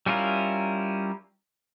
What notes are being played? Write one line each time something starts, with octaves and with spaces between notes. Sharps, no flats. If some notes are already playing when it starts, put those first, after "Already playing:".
G3 C#4 E4 F4 A#4